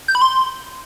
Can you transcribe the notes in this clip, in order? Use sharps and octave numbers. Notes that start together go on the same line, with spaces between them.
G6
B5
C6